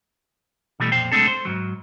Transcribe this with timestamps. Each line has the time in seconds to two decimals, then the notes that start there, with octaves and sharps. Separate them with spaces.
0.80 B2 E3 G3 A3
0.92 F2 A#2 C5 G5
1.12 C2 G#3 A3 C4 D4 A4
1.27 C5
1.45 G#2 B2 F#3